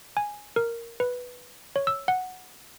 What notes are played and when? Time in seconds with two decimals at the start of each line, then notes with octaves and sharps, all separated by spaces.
0.17 G#5
0.56 A#4
1.00 B4
1.76 C#5
1.87 E6
2.08 F#5